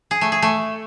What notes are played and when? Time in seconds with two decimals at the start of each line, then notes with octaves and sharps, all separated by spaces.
0.11 G#4
0.21 A3
0.32 G#4
0.42 A3